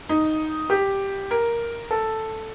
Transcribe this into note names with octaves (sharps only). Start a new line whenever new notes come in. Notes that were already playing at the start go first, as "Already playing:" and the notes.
D#4
G4
A#4
A4